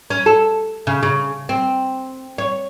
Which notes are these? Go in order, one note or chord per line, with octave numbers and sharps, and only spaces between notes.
C#4
A4
C#3
C#3
C4
C#5